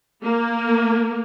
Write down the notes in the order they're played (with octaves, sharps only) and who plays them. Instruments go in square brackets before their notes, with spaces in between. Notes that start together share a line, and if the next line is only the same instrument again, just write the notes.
[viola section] A#3